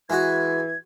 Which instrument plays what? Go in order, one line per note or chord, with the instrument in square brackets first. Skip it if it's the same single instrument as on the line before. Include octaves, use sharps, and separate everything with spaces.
[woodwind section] E3 [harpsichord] G#3 F#4 [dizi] G#6